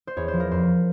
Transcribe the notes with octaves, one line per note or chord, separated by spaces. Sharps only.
C5
E2 C#5
C5
F3
A#4
F2 C5